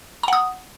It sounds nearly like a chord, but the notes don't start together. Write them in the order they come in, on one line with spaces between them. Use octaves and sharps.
A#5 F#5 D#6